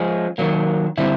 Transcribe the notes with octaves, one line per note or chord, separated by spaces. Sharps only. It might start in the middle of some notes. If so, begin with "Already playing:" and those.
Already playing: F3 G#3 C#4
D#3 F#3 A#3
D3 G3 C4 E4